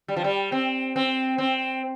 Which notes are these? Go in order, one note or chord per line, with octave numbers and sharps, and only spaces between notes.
G3
F3
G3
C4
C4
C4